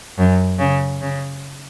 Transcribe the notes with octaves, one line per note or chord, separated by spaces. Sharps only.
F#2
C#3
C#3